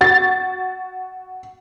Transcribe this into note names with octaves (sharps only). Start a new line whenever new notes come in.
F#4 A6